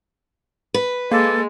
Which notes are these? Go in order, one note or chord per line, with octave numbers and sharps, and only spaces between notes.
B4
G#3 A#3 A4